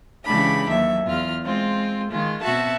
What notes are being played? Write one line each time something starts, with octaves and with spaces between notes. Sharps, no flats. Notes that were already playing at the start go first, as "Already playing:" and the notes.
C#3 E3 G#3 D4 G4 B5
D#2 F#3 E5
E2 F4 F6
G#3 C4 F4
D#3 G#3 F4
B2 C4 F#4 E5 A5 F#6